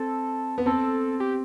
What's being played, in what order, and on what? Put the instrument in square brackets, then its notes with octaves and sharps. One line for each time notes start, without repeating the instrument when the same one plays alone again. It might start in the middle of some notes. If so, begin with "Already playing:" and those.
Already playing: [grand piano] C4 [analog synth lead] A4
[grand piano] B3
[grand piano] C4 [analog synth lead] A4
[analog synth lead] G4